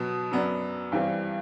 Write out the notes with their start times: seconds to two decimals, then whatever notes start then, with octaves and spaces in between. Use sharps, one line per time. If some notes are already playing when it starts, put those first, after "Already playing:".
Already playing: B2 F#3 B3
0.31 F#2 F#3 B3 D4
0.92 G2 E3 G3 C4